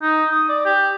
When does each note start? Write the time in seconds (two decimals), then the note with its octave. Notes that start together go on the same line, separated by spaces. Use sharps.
0.02 D#4
0.31 D#6
0.49 D5
0.65 G4